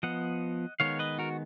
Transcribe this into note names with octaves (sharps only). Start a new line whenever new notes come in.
F3 B3 D#5 F#5
D#3 G#3 B3 C#5 F5
B4 D#5
F#4 A#4